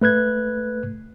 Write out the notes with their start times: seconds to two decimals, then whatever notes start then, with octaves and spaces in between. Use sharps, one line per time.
0.02 A3 B4 F#6 G#6